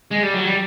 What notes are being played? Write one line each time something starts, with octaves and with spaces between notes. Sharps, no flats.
G#3
G3
F#3
G3